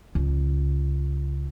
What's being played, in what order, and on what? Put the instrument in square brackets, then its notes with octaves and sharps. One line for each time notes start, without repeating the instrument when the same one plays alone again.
[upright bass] C#2